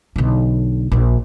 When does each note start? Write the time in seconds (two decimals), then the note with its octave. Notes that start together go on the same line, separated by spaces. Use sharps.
0.16 B1 D3
0.92 A#1